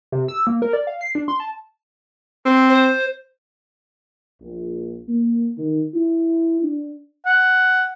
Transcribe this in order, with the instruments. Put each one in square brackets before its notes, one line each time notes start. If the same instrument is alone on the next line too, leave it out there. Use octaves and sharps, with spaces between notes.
[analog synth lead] C3
E6
A#3
A#4
D5
F5
C7
D4
C6
A5
[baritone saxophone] C4
[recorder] C5
[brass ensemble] A#1
A#3
D#3
E4
D4
[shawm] F#5